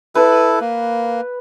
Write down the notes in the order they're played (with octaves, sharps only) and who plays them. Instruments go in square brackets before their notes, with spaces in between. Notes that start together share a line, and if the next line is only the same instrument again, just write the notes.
[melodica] E4 A4 [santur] B4
[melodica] A#3